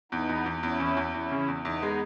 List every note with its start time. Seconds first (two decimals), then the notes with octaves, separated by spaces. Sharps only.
0.12 E2 B3 D#4
0.29 E2
0.46 E2
0.63 E2 C#4 E4
0.80 E2
0.97 E2
1.14 E2 C#4 E4
1.32 C#3
1.48 E2
1.65 E2 B3 D#4
1.82 G#3